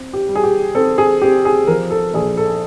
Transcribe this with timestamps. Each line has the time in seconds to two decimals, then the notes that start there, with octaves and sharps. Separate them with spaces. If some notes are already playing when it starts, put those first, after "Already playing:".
Already playing: C4
0.13 G4
0.29 G3
0.36 G#4
0.44 G4
0.75 C4 A4
0.98 G#4
1.22 C4 G4
1.45 G#4
1.67 F3 A#4
1.91 A4
2.14 A#1 G#4
2.37 A4